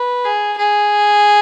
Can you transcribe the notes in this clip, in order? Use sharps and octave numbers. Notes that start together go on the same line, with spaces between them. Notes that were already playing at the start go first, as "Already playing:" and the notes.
Already playing: B4
G#4
G#4